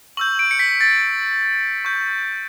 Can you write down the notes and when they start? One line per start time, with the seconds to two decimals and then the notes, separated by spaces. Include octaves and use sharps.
0.17 C#6 E6 G6 F#7
0.39 D7
0.51 C#7
0.59 B6
0.81 A6
1.85 C#6 G6